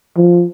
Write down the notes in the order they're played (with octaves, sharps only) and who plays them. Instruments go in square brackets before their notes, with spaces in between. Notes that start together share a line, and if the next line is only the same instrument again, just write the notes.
[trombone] F3